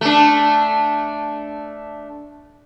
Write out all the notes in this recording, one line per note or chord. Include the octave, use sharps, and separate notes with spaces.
A3 D4